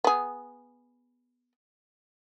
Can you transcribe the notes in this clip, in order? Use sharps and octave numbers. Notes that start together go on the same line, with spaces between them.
B3 G#4